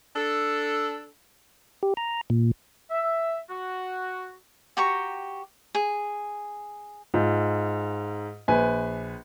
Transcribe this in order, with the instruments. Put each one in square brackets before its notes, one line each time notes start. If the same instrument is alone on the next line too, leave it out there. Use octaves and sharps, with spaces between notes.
[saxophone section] D4 A4
[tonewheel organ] G4
A#5
A#2
[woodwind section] E5
F#4
[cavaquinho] F#4 G4 A#5 C#6
G#4
[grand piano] G#2 F4
A#1 B4 G#5